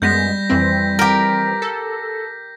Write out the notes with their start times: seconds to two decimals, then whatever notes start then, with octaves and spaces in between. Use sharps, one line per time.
0.02 F#2 G3 G#3 B3 G6 A#6 B6
0.50 F2 E3 C4
0.99 G4 A#4
1.62 A4